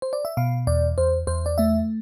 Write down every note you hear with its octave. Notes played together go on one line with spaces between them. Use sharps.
C5
D5
E5
B2 F5
E2 D5
E2 C5
E2 C5
D5
A3 E5